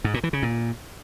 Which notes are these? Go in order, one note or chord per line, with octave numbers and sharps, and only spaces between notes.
G#2
A#2
E3
C#3
A#2